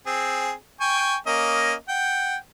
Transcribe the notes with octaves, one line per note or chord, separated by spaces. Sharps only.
C4 G#4
G5 G#5 C#6
A#3 C#4 D#5
F#5 G5